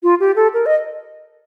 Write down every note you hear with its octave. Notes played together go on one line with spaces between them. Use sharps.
F4
G4
A4
A#4
D#5